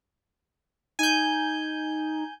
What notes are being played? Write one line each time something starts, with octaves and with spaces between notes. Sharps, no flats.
D#4 G#5 G6